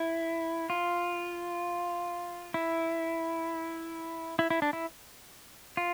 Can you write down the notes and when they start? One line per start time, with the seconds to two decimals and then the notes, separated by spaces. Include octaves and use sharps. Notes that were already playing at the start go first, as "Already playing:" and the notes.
Already playing: E4
0.70 F4
2.54 E4
4.39 E4
4.50 E4
4.62 D4
4.73 E4
5.77 F4